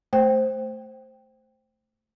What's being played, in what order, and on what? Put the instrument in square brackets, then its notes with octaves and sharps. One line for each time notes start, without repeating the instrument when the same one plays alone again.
[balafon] A3 C5 G5